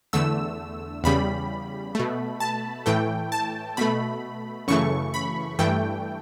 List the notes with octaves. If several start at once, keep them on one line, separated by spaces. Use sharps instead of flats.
E2 D3 A3 E6
E2 C#3 G3 B5
B2 A3
A5
A2 E3 A3 G5
A5
B2 A3 B5
F#2 C#3 E3 A3 C#6
B5
G2 E3 A3 G5